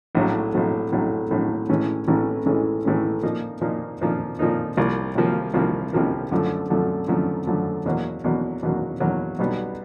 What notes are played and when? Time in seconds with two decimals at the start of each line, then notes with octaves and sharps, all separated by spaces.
0.15 A#1 A2 F#3
0.54 A#1 A2 F#3
0.92 A#1 A2 F#3
1.31 A#1 A2 F#3
1.69 A1 A2 E3 G#3 C#4
2.08 A1 A2 E3 G#3 C#4
2.46 A1 A2 E3 G#3 C#4
2.85 A1 A2 E3 G#3 C#4
3.23 A#2 F3 A#3 D#4
3.61 A#2 F3 A#3 D#4
4.01 A#2 F3 A#3 D#4
4.39 A#2 F3 A#3 D#4
4.77 C2 C3 F3 A#3
5.15 C2 C3 F3 A#3
5.54 C2 C3 F3 A#3
5.93 C2 C3 F3 A#3
6.31 F#2 D3 F3 A3
6.70 F#2 D3 F3 A3
7.08 F#2 D3 F3 A3
7.47 F#2 D3 F3 A3
7.85 E2 B2 F#3 A#3
8.24 E2 B2 F#3 A#3
8.63 E2 B2 F#3 A#3
9.00 E2 B2 F#3 A#3
9.39 B1 B2 G3 B3